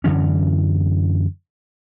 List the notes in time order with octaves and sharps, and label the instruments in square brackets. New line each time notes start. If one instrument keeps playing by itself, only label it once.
[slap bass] F#2 D3 E3 C#4